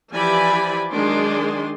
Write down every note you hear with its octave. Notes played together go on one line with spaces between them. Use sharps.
E3 F3 G4 D5 G#5 B5
D#3 F#3 G#3 D4 G#4 C6